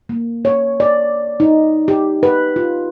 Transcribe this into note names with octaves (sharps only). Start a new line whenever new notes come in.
A#3
C#5
D5
D#4
G4
B4
F4